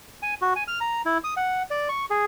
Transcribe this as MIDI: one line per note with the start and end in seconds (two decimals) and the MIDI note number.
0.22 0.34 80
0.41 0.53 66
0.56 0.63 80
0.68 0.79 89
0.81 1.02 82
1.06 1.18 64
1.24 1.34 87
1.37 1.63 78
1.70 1.88 74
1.89 2.05 85
2.10 2.25 68